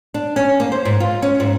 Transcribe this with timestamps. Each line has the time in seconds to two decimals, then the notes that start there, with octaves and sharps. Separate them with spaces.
0.14 D4
0.36 C#4
0.60 A#3
0.72 C5
0.85 G#2
1.00 F4
1.22 C#4
1.40 G#2